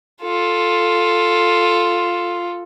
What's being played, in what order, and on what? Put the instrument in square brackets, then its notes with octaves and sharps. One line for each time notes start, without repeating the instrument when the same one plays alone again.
[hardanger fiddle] F4 A4